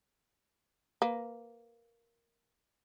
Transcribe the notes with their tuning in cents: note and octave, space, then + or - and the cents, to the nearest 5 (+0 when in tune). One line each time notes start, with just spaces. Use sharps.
A#3 +0 B4 +15